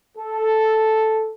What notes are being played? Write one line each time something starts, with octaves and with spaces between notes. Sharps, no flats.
A4